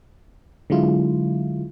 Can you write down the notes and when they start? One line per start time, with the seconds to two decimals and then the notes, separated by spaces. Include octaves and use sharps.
0.70 D3 F#3 G#3 E4 F4